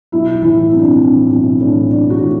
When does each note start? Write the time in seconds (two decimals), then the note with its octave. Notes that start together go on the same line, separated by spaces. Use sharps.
0.12 B1 E4
0.42 A2 E3 E4
0.72 B1 C4
0.79 D4
0.86 C4
1.02 A2 E3 C4
1.31 B1
1.60 A2 E3 D4
1.90 B1 D4
2.10 F#4
2.20 A2 E3